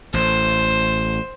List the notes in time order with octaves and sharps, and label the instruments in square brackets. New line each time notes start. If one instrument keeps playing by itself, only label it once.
[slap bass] A1 A2 [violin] C5